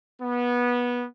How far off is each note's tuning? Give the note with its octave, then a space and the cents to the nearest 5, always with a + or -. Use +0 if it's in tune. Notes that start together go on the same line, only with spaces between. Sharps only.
B3 -20